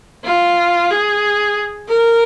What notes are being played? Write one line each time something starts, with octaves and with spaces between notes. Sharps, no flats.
F4
G#4
A#4